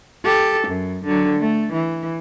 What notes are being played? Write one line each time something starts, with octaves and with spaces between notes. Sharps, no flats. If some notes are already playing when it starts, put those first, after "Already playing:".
G4 A4
F#2
D3 F#3
A3
E3